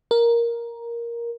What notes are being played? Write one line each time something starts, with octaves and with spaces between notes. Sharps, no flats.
A#4